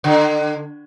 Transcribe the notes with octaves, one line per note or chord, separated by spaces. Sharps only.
D3